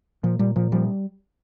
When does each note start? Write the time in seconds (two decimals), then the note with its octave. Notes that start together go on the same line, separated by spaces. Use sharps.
0.23 A#2 F3
0.39 A#2 G3
0.56 A#2 F3
0.72 F3 G3